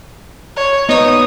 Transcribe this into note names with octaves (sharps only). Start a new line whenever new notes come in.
C#5
B3 D#4 C#5 D#6